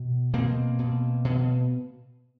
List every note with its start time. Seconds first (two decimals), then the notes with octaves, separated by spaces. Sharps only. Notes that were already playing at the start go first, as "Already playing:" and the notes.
Already playing: B2
0.34 B2 A#3 C4
0.79 B2
1.25 B2